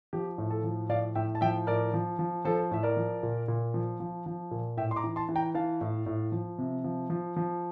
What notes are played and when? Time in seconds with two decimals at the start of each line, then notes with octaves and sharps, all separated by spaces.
0.13 F3 G4
0.38 A2
0.50 A4
0.64 F3
0.89 A2 D5 F5
1.15 A2 E5 G5
1.35 A5
1.41 F3 E5 G5
1.67 A2 A#4 D5
1.94 F3
2.19 F3
2.45 F3 A4 C5
2.71 A2 E5
2.83 A#4 D5
2.97 F3
3.23 A#2
3.48 A#2
3.74 F3
4.00 F3
4.26 F3
4.51 A#2
4.77 A2 E5 G5
4.91 C6
4.96 A#5 D6
5.04 E3
5.16 A5 C6
5.29 E3
5.36 G5 A#5
5.54 E3 F5 A5
5.81 A2
6.06 A2
6.32 F3
6.59 C3
6.84 F3
7.10 F3
7.36 F3